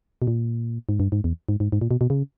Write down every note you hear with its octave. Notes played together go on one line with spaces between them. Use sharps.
B2
A#2
G#2
G2
G#2
E2
G#2
G#2
G#2
A#2
B2
B2
C#3